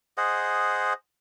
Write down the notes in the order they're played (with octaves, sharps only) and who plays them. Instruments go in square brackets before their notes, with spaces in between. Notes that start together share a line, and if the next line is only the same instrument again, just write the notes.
[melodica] G#4 C5 D#5 F#5